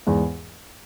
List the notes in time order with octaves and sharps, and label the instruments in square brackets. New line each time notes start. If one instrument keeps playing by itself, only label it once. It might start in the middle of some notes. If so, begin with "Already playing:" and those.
[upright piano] E2 G#2